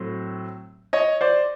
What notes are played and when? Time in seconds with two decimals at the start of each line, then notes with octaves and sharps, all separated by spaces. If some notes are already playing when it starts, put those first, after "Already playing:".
Already playing: A2 F#3 A3 C4
0.93 C#5 D#5
1.21 C5 D5